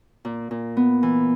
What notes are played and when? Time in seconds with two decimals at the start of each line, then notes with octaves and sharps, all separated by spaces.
0.25 A#2
0.51 A#2
0.77 B3
1.03 E3